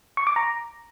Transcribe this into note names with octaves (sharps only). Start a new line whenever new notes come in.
C#6
D6
A#5